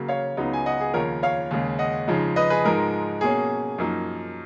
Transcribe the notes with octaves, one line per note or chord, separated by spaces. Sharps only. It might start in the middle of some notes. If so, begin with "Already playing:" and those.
Already playing: C#3 F#3 A#3
C#5 F5
C#2 C#3 F#3 B3 D#4
G#5
D#5 F#5
G#4
D#2 C#3 F3 A#4 C#5
C#5 F5
D#2 C#3 G#3
D#5 F#5
F2 C#3 F3 G#3 D#4
B4 D#5
G#4 B4
G#2 F3 G#3 D#4 A#4
B2 A#3 C#4 G#4
F#2 F3 A#3 D#4